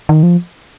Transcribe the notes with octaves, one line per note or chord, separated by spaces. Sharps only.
D#3
F3